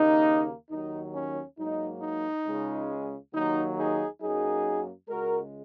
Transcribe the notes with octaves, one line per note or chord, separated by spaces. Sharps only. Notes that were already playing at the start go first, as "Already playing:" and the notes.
Already playing: D#2 C#3 A#3 D#4
D#2 D#3 F#3 D#4
C#4
G#2 F#3 A#3 D#4
D#4
C#2 C#3 G#3
D#2 D#3 F#3 A#3 D#4
D#4 G#4
F#2 F#3 A#3 D#4 G#4
C#2 C#3 G#3 F#4 A#4